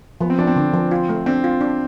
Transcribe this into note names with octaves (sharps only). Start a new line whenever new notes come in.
F3 B3
C4
F3 D4
C4
D3
F3
F4
A3
C4 D4
F4
D4